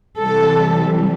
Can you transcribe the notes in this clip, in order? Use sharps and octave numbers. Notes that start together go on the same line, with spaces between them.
C3 E3 G3 A4